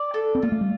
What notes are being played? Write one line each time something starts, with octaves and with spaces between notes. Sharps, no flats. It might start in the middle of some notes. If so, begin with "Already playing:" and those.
Already playing: D5
A4
C4
A#3 F4
A3
G3